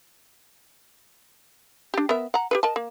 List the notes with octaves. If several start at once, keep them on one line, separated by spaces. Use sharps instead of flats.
D4 G4
B3 A#4 E5
F#5 A#5
G4 G#4 B4
A#4 D#5 A5
A#3